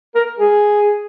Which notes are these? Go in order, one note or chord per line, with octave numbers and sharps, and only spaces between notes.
A#4
G#4